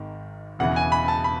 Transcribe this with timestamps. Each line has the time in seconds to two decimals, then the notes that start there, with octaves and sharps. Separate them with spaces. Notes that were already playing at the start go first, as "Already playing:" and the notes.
Already playing: G#1 G#2 D#3
0.59 E1 E2 C#3 E3 F#5
0.76 G#5
0.92 B5
1.08 A5
1.24 B5